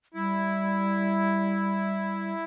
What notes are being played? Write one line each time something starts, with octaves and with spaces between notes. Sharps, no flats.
G3 E4